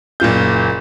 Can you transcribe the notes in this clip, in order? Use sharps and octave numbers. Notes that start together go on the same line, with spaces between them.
F#1 A#2 F4 G6